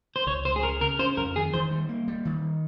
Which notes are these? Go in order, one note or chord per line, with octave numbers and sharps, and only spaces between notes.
C5
C#2 C#5
C#2 C5
G#4
C#3 A#4
C#3 A#4
C#4 C5
F2 A#4
D#3 G#4
D#3 C5
G3
A#3
G3
D#3